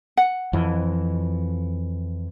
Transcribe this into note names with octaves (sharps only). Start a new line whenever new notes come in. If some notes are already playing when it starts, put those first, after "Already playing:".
F#5
F2 E3